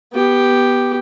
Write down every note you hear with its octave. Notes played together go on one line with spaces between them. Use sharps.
B3 G4